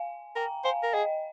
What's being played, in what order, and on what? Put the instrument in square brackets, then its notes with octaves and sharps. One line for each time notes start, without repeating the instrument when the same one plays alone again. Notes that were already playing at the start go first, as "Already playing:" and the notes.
Already playing: [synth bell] F5 G#5
[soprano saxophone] A#4 [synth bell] G5 A#5
[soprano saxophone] C5 [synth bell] F5 G#5
[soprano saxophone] A#4
[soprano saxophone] G#4 [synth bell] D#5 G5